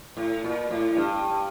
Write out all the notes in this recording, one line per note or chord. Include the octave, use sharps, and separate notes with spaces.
A2
A#2
A2
G2